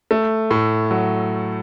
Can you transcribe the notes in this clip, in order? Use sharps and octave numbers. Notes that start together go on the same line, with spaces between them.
A3
A2
F#3